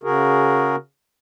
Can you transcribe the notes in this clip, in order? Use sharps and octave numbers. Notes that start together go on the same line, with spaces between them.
C#3 F#4 G#4 A#4